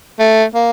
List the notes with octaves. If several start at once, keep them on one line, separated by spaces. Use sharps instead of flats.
A3
A#3